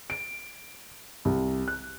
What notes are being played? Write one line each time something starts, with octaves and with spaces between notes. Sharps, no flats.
D7
C2
F#6